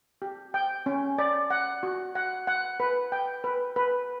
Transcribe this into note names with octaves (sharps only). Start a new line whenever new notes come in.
G4
G5
C#4
D5
F#5
F#4
F#5
F#5
B4
G5
B4
B4